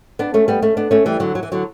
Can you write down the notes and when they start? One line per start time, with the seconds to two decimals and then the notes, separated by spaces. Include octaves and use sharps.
0.19 B3 D4
0.34 A3 C#4
0.48 G3 B3
0.62 A3 C#4
0.77 B3 D4
0.91 A3 C#4
1.06 E3 G3
1.20 D3 F#3
1.35 F#3
1.43 E3
1.52 D3 F#3